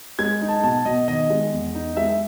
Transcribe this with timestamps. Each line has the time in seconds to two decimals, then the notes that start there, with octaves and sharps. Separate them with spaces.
0.19 G#3 G#6
0.41 D#4
0.48 A5
0.63 B2 A5
0.85 B2 D#5
1.08 D#3 D#5
1.30 G#3
1.53 E2
1.75 D#4
1.97 G#3 E5